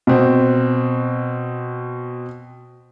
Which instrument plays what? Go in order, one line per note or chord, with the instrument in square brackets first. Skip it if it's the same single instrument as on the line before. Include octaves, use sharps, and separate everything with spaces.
[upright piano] B2 C4